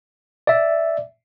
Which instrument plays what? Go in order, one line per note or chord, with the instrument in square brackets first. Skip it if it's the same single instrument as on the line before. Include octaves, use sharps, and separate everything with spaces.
[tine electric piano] D5 E5